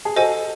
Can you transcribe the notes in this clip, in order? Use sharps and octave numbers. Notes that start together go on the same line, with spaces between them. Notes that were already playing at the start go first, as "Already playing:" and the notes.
G#4
F#4 A4 C5 D#5 G#5